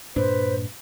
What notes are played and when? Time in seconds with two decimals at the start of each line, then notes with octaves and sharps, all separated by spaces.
0.16 G2 A#2 D4 B4 C5